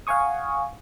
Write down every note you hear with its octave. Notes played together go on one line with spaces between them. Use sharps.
F5 F#5 G#5 C#6 D#6